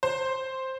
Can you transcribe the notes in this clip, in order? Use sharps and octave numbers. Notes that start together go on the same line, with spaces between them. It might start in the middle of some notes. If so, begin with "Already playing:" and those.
C5